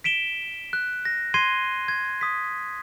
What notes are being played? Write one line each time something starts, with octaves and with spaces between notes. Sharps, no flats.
B6 D7 E7 G7
F#6
A#6
C6 G#6 A#6 C7 D#7 G7
G#6
D#6 B6